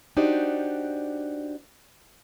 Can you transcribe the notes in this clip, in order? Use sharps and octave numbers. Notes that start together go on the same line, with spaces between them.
D4 D#4 F#4 G4 C5 D5